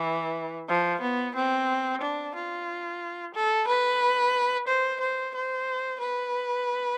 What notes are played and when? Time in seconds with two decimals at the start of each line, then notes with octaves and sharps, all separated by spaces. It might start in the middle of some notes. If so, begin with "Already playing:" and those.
Already playing: E3
0.69 F3
1.01 B3
1.35 C4
2.01 D4
2.35 F4
3.34 A4
3.68 B4
4.68 C5
5.00 C5
5.35 C5
6.00 B4